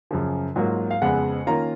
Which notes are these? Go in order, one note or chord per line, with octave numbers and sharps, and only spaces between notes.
F#2 C#3 F3
G#2 F#3 A#3 F4
F5
F2 C#3 G#3 B3 F#5
D#3 A#3 C#4 F4 A#5